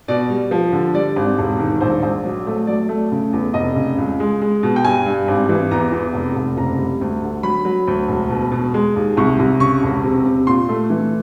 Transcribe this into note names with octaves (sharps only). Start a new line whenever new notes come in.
B2 D5
G3
F3
D3
G3 D5
G#1
E1
D#3
A#1 C5
A#1
F#3
A3
F#3 D5
A3
C#3
E2
F1 D#5
C#3
C#2
G#3
G#3
B2
G5
G2 G#5
G2
G#1
E3
E2 A#5
E2
F1
F1
F#1 A#5
G3
D2
D3
F#3 B5
F#3
D2
E1
B2
B2
G#3
D#2
C2 C#6
C2
C#3 C#6
E1
C3
C3
A#2 C6
A3
E3